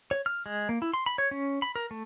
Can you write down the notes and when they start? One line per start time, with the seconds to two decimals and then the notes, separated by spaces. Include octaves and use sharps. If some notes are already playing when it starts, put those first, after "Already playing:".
0.11 C#5
0.26 F6
0.46 G#3
0.69 A#3
0.82 E4
0.94 C6
1.06 B5
1.18 C#5
1.31 C#4
1.62 B5
1.76 A#4
1.91 A3